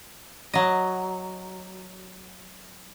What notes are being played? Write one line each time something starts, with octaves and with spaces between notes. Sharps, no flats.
F#3 D#5